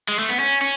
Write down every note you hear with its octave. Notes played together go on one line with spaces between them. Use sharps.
G#3
A3
B3
C#4
C#4